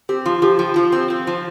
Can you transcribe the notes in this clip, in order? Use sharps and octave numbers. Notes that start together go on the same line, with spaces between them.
C4 G4
F3 F4
F3 G4
F3 G4
F3 F4
C4
C4
F3